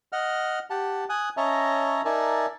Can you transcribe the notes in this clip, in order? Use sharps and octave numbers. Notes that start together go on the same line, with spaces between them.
D#5 F#5 F6
G4 F#5 A5
G#5 D#6 F#6
C#4 C#5 D#5 E5 A5 A#5
D#4 A#4 D5 E5 G#5 A5